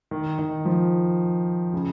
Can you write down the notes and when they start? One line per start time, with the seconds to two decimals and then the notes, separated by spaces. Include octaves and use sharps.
0.11 D#3
0.39 D#3
0.65 F3
1.73 C#3